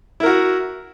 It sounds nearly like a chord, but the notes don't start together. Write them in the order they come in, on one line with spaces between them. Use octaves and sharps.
E4 A#4 F#4